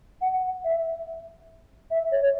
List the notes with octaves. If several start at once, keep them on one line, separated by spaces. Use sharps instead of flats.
F#5
E5
E5
C#5